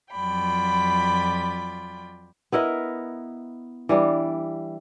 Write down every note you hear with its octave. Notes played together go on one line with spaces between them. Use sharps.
F2 F#3 F4 D5 G5 B5
B3 E4 A#4 D#5
E3 G3 D4